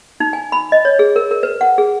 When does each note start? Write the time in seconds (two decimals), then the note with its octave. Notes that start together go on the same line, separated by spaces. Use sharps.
0.20 D#4
0.33 G#5
0.52 B5
0.72 D#5
0.85 C#5
0.99 G#4
1.16 A#4
1.31 A#4
1.43 B4
1.61 F#5
1.78 G#4